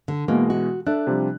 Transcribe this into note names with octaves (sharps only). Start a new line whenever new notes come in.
D3
B2 E3 G#3 A#3
F#4
D4 A4 E5 F#6
C3 F3 G3